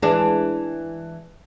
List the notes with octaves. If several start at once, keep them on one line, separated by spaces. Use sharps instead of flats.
E3 G#3 D4